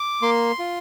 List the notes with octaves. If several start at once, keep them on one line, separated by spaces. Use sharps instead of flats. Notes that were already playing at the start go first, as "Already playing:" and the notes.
Already playing: D6
A#3 C6
F4